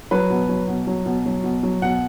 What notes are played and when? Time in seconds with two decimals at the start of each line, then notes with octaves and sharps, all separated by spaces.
0.11 F#3 B4
0.30 B2
0.49 F#3
0.68 B2
0.87 F#3
1.06 B2
1.26 F#3
1.44 B2
1.63 F#3
1.82 B2 F#5